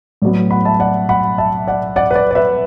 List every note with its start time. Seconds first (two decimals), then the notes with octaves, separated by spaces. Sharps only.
0.22 A2 F#3 B3 D5
0.51 F#5 B5
0.65 E5 A5
0.80 D5 F#5
1.09 F#5 B5
1.38 E5 A5
1.67 D5 F#5
1.96 D5 F#5
2.11 B4
2.15 D5
2.31 D5
2.35 B4 E5